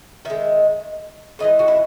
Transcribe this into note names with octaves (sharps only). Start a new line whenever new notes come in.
D#3 G#3 E5
C#3 E3 G#3 D#5
F#4
E4